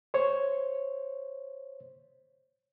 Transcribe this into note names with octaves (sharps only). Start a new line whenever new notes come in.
C5 C#5